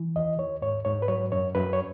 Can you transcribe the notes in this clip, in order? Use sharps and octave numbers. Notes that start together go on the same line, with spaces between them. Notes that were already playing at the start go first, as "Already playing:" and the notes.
Already playing: E3
D#2 D#5
D#2 C#5
G#2 C#5
G#2 C#5
B4
F#3 C#5
F#2 C#5
F#2 B4
C#5